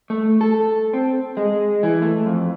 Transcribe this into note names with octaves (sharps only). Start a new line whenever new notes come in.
A3
A4
C4
G#3
E3
A3
F2